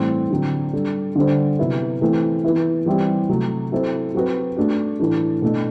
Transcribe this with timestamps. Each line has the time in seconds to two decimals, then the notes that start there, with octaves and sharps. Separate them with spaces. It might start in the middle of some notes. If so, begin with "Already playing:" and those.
Already playing: A2 E3 G3 C4
0.31 D3 F#3 C4
0.73 G3 D4 A4
1.16 D3 G3 D4 A4 C5
1.59 C3 F#3 B3 E4 B4
2.01 E3 A3 C4 E4 A4
2.44 E3 B3 E4
2.86 E3 G3 C4 E4 G4
3.29 C3 F#3 A3
3.72 F#3 C4 E4 A4 C5
4.14 F#3 C4 F#4 B4
4.57 A3 D4 F#4
4.99 A2 E3 A3 D4
5.42 B2 A3 D4 A4